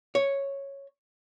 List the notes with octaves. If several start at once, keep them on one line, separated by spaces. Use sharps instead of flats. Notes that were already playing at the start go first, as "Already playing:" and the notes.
C#5